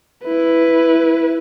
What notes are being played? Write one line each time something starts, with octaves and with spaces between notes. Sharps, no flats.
E4 B4